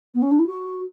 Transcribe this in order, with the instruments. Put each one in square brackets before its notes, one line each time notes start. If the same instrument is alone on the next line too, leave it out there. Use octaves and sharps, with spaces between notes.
[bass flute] B3
C#4
D4
E4
F#4